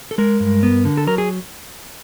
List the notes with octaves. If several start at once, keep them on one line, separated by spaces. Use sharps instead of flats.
A4
G#3 A#4
G2
B3
D3
A4
F#3 A#4
G#4